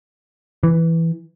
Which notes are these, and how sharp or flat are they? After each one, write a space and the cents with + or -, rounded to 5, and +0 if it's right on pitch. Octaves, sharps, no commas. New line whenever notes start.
E3 +0